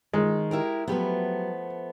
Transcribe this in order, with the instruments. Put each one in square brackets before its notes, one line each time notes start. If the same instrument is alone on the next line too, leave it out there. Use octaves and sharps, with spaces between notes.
[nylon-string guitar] D#3 [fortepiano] G#3
[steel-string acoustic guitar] E4 G4 A#4
[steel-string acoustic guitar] F3 A3 B3 [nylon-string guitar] F#3 G4 B4